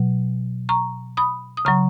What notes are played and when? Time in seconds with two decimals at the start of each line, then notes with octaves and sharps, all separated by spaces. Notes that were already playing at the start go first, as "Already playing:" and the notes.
Already playing: B2 F#3
0.69 A#5 C#6
1.17 B5 D#6
1.57 D#6
1.65 C#3 F#3 A#5 C#6